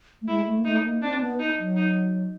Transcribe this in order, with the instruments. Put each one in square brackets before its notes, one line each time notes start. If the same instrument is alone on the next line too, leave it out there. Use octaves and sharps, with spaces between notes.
[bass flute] A3
[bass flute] G#3 [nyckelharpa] E4
[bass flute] A3
A#3
[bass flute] A3 [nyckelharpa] D#4
[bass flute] A#3
[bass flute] C4 [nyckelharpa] D4
[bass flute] B3
[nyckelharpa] D#4
[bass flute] F#3
[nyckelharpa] D#4